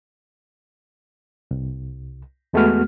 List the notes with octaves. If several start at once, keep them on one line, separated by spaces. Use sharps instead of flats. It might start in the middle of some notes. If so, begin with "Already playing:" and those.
C2
E2 G#3 A3 B3 F#4 F6